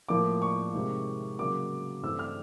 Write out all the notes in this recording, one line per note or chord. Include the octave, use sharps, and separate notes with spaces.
A2 F3 A#3 D6
C#6
C3 D#3 G#3
C#3 F#3 A#3 D6
G2 E3 A3 C4 E6
F6